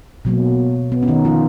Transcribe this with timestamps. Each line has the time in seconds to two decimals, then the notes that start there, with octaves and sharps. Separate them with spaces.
0.25 B2 F#3 A#3
0.92 B3
1.03 C#4
1.08 D#3 D#4
1.25 F3 F4